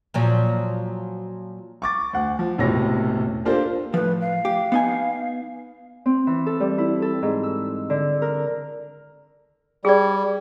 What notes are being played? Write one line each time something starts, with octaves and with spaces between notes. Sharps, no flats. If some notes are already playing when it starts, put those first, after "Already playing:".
A#2 F3 F#3
C#6 D6 A6
D2 F#5
F3
E1 A2 C3 C#4 C#5 A#6
A#3 D4 F4 G4 A4 C5
A2 F3 B4
F5
G4
B3 D#4 G#5
C4
E3
A4
G3
E4
A4
G#2
E6
D3
A#4
G3 G#4 D5